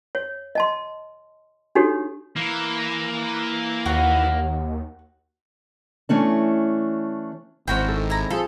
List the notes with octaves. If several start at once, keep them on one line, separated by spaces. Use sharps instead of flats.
C#5
D#5 A5 C6
D4 D#4 F#4 G4 A4 C#5
E3 A#3
D#2 F#4 F#5
E3 A3 C#4 D4
G#1 C4 C#4 E4 F#4 G5
A4
E4 A#5
F3 G#4 A4